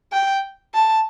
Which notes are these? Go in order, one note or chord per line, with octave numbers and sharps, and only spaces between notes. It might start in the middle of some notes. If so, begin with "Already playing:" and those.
G5
A5